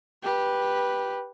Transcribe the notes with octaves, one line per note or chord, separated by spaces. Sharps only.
G4 B4